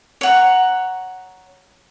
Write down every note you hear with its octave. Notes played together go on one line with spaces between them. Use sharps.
C#5 F#5 A#5